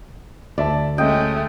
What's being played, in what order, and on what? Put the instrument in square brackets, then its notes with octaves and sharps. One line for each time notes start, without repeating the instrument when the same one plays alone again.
[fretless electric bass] D2 [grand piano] D5 E5 A5
[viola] G#3 A3 [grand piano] C#4 [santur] D#5 G5